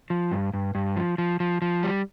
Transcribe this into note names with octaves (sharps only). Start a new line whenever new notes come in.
F3
G2
G2
G2
F3
F3
F3
F3
G3